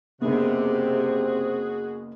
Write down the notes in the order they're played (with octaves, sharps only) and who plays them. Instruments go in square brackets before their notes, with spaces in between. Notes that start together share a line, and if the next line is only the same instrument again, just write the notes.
[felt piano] F#1 B3 [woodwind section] C3 [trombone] C4 [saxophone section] F#4 G#4